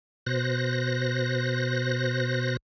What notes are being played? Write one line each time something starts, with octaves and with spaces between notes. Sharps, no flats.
B2 C5 F#6 A#6